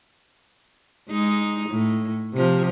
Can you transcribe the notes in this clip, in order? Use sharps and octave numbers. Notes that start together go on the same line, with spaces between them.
G#3 D#4
A2
C3 F3